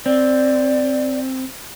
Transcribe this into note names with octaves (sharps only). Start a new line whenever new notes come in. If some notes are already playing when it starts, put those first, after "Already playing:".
C4 D5